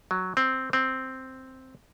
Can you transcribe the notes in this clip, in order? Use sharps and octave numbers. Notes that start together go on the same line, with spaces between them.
F#3
C4
C4